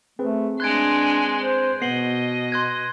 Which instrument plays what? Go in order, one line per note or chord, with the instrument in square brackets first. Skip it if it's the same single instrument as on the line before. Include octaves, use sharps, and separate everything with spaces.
[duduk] A3 [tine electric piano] C4 G#4 B4
[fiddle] G#3 C6 [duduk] D4 [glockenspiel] F#6 G#6 D7
[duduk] C5
[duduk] B2 [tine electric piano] B3 [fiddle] D#5 [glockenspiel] C7 F#7 G7
[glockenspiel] C6 F#6 G#6